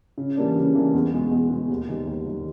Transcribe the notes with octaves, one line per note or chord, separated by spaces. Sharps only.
C#3
E3 G3 A#3 D4
C#3
E3 G3 A#3 D4
E2
B2 G#3
E2
B2 G#3
D#2
D#3 G3
D#2
D#3 G3